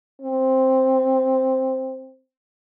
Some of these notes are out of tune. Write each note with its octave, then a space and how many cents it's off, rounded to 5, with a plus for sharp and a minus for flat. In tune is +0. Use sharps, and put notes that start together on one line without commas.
C4 +5